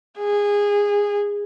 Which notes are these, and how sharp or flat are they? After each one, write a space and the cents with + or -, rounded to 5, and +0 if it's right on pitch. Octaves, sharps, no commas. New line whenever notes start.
G#4 -20